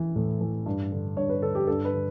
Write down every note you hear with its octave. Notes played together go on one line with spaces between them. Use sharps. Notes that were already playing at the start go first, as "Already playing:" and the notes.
Already playing: E3
A2
E3
G2
D3
G2 C#5
B4
D3 A4
G4
G2 A4
B4
D3